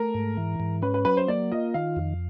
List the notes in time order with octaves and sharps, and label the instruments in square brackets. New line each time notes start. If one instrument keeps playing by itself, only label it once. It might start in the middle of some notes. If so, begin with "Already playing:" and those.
Already playing: [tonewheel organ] A3 [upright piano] A#4
[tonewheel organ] G#2
E3
G#2
[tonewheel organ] C#4 [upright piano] B4
[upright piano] B4
[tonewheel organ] F#3 [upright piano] B4
[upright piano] C5
[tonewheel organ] A#3 [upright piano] D5
[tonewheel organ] F4 [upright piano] D#5
[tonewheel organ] D#3 [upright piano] F5
[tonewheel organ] F2